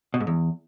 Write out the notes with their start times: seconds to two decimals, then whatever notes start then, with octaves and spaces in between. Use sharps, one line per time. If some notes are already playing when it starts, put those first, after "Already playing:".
0.14 B2
0.20 G#2
0.27 E2